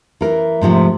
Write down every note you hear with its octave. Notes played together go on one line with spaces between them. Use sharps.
E3 A#4
G#2 C3 F3 A3